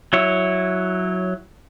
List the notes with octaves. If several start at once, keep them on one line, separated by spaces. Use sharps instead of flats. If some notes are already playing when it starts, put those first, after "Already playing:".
F#3 E4 C#5